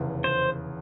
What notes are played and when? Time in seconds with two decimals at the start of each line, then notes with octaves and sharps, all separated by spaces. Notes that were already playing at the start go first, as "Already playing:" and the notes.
Already playing: F1 E2 C#3
0.24 C5